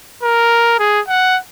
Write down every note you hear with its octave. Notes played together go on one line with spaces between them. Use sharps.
A#4
G#4
F#5